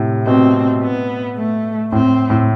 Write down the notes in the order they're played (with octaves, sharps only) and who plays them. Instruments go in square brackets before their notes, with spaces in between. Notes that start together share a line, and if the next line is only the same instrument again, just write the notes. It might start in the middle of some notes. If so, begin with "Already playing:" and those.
Already playing: [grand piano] A2 C3
[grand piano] B2 [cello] C4
[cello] B3
A3
[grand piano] A2 [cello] C4
[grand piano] A2